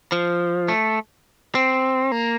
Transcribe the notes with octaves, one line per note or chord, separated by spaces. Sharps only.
F3
A3
C4
A#3